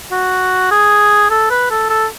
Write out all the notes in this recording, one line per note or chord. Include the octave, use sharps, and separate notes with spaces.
F#4
G#4
A4
B4
A4
A4